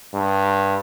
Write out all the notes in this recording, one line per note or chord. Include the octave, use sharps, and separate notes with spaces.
G2